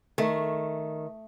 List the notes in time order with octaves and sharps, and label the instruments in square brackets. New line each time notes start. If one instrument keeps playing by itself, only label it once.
[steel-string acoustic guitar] D#3 [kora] A3